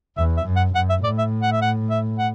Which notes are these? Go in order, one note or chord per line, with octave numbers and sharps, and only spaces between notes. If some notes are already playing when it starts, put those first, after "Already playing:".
E2 E5
E5
F#2
F#5
F#2 F#5
E5
A2 D5
E5
F#5
E5
F#5
E5
F#5